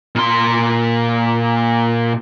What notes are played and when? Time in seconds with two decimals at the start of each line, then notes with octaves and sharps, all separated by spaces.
0.15 A#2 C6